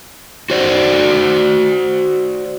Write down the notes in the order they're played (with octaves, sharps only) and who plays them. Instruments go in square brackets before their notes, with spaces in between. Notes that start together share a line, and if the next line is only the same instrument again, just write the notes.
[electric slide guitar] F#4 C5 D5